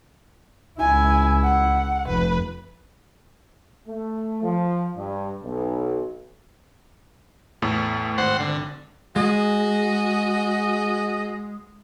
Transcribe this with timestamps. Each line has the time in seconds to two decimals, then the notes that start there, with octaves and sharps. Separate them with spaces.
0.80 C#2 E4 G#5
1.44 F#5
2.07 F1 B4
3.88 A3
4.43 F3
4.96 G2
5.43 B1
7.62 E2 A2 A3
8.18 G#1 C5 F#5
8.40 D3
9.16 G#3 F#4 G#4 D#5